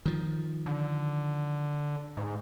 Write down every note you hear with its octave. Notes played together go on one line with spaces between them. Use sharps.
D#3 F3
D3
G#2